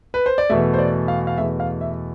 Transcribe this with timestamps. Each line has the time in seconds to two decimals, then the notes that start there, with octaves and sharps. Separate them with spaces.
0.14 B4
0.26 C5
0.38 D5
0.50 E2 B2 A3 E5
0.74 C5
0.79 D5
1.08 F5
1.27 F5
1.37 E2 B2 A3 E5
1.60 F5
1.81 E5